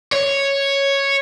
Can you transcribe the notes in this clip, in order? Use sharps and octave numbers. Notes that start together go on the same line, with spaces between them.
C#5